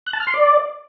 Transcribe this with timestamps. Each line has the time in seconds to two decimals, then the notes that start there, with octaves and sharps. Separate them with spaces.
0.06 F#6
0.13 A5
0.20 F6
0.27 C6
0.34 D5